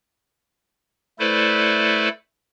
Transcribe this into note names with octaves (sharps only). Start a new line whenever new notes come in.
A3 E4 A4 B4 C5 D5